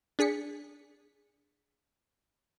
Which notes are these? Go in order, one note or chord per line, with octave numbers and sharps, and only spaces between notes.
D4 G#4 B6 C#7